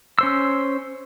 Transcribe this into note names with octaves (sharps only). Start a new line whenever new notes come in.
C#4 C5 E6